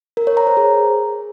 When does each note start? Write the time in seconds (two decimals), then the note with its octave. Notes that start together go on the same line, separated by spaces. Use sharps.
0.17 A#4
0.27 C#5
0.37 A#5
0.47 C5
0.57 G#4